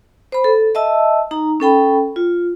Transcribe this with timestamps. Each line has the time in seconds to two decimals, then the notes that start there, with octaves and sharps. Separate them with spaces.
0.32 C5 B5
0.44 A4
0.75 D#5 E5 A5 E6
1.31 D#4 A#5
1.60 C#4 A4 G5 B5
2.16 F4